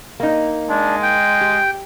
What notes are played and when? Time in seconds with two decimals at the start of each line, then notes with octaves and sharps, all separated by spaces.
0.20 A#3 D#4
0.69 G#3 D4
1.02 G5
1.41 G4